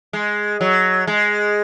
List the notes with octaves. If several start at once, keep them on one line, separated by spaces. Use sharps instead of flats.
G#3
F#3
G#3